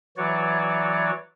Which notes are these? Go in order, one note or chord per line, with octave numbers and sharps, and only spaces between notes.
E3 F#3 F#4 C#5 D5